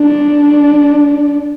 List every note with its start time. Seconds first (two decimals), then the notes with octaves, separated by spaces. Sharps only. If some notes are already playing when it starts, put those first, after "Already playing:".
Already playing: D4